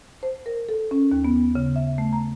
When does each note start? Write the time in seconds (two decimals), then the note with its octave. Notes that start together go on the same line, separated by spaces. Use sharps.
0.23 C5
0.46 A#4
0.69 A4
0.91 C#4
1.12 D#2
1.25 B3
1.55 C#3
1.76 E5
1.98 A3
2.13 A#5